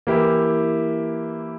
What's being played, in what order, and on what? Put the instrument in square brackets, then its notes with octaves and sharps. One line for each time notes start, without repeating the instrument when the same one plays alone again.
[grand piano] E3 A#3 E4 G4